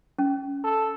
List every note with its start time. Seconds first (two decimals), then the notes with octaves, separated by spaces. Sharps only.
0.19 C#4
0.64 A4